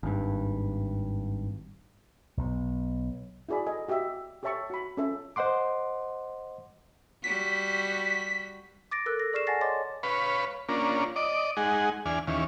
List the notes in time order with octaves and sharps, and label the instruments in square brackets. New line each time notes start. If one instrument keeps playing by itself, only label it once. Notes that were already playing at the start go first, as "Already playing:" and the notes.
[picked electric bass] G#1 G2
[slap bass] B1
[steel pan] E4 F#4 G#4 D5 B5
A4 D#5 G#5
F#4 G4 D#5 E5
G4 A4 C#5 E5 A5 C#6
F#4 B5
C#4 F4 A4 E5
[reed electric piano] C5 D#5 F#5 C6 D6
[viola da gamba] G3 F#4 [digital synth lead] B6
[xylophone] D6 A6 A#6 D7
A4 A#4 E6 F#6
A#6
G#4 D5 C#6 F6 C7 E7
F#5 G#5 A5 A6 A#6 C7
C#5 D#5 C6 D6 A6
[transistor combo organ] B4 C#5 F5 B5
A#3 C#4 D4 F4
D5 D#5 D6
G#3 D#4 G#4 F#5
E2 D4 G#5 F6
D#2 E3 C#4 F5